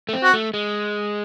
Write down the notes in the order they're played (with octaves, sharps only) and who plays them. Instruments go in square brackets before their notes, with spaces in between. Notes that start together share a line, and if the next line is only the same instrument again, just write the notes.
[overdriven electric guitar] A3
C4
[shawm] F#4
[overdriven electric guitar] A3
G#3